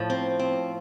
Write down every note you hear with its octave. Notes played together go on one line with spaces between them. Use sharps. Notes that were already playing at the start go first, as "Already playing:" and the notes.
Already playing: A2 F3
C4
C4